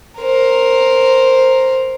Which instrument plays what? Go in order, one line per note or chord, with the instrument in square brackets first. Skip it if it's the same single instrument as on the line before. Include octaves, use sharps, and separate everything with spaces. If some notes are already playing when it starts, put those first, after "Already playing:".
[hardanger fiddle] A#4 C5